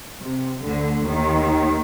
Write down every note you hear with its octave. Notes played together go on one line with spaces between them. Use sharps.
C3
D2 D3
D#2 D#3